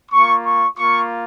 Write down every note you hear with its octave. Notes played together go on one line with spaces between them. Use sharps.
A#3 F4 C#6
C#6
A#3 F4 C#6